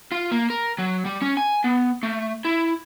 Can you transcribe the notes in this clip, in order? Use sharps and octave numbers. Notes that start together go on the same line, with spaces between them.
F4
A#3
A#4
F#3
G3
C#4
G#5
B3
A3
E4